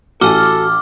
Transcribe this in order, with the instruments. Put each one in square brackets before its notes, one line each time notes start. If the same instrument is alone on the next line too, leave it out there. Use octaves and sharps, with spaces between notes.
[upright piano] A1 [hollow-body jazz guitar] F#4 G#5 [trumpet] A4 [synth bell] D6 F6